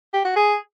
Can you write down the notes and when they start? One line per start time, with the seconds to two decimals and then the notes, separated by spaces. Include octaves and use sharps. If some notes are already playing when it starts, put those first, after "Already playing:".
0.14 G4
0.25 F#4
0.36 G#4